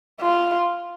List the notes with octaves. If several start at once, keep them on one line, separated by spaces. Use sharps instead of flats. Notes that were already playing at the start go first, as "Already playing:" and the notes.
F4